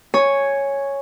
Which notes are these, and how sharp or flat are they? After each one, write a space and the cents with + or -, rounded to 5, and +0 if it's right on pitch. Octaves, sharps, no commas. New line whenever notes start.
C#5 +0 G#5 +0